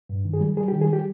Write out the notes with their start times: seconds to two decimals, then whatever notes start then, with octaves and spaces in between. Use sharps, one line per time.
0.09 G2
0.25 D#3
0.33 G#4
0.41 G3
0.57 G3 G#4
0.68 G4
0.72 D#3
0.81 G#4
0.89 G3 G4